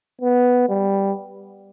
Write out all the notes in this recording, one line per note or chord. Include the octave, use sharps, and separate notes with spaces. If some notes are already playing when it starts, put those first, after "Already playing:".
B3
G3